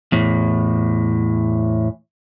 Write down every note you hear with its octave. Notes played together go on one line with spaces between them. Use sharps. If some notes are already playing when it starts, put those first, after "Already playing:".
E2 A2